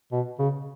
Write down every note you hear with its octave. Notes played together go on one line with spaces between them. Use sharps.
B2
C#3